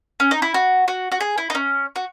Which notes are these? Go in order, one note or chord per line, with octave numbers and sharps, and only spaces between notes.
C#4
D#4
E4
F#4
F#4
F#4
G#4
E4
D#4
C#4
F#4